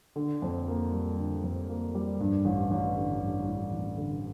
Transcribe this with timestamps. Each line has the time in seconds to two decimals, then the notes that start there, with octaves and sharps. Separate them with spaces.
0.16 D3
0.42 F2
0.68 A#3
0.93 G3
1.18 D3
1.44 F2
1.69 A#3
1.95 G3
2.20 G2
2.45 A1
2.71 A1
2.97 D3
3.22 G2
3.47 A1
3.73 A1
3.97 D3